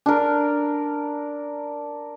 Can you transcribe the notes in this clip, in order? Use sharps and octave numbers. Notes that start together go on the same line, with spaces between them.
D4 A#4